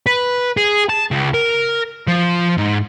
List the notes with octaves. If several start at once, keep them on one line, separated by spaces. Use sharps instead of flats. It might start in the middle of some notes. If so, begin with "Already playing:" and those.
B4
G#4
A5
C#2
A#4
F3
G#2